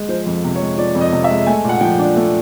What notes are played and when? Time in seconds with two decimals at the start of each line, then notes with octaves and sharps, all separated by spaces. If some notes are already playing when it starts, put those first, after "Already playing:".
Already playing: G#3
0.09 F3 C5
0.26 F2
0.44 C3
0.55 C#5
0.61 G#3
0.78 F3 D5
0.95 F2
1.01 D#5
1.12 C3
1.24 E5
1.30 G#3
1.47 A3 G#5
1.64 A#2 F#5
1.81 F3 G5
1.99 D4
2.16 A3